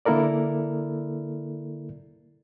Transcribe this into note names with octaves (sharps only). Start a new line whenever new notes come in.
D3 A#3 E4 A4 A#4 D5